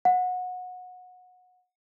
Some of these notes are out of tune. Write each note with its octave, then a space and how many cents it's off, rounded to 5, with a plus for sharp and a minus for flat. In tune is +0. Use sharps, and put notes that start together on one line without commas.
F#5 -25